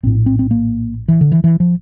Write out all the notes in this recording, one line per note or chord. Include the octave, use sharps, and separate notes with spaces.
A#1 A2 C4
C4
C4
A#3
E3
D3
E3
E3
F3